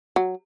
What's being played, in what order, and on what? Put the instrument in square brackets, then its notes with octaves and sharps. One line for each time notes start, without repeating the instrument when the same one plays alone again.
[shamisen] F#3